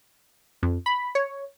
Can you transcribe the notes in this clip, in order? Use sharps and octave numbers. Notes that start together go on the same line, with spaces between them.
F2
B5
C#5